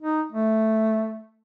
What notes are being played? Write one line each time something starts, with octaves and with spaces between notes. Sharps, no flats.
D#4
A3